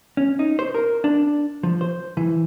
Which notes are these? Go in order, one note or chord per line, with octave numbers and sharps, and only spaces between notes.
C#4
D#4
C5
A#4
D4
F3
C5
E3